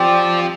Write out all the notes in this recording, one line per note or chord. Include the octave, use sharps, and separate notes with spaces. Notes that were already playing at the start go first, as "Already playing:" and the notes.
Already playing: F3 C4 G4 D5